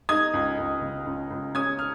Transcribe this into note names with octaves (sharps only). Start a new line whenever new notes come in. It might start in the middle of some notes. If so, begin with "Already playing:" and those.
D#4 D#6 G#6
C#2
C#2
C#3
C#2
C#2
C#4 D#6 G#6
F6